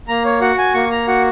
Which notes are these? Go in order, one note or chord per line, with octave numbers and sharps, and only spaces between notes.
A#3 A#5
C#5
F#4 F#5
G#5
A#3 C#6
A#5
F#4 F#5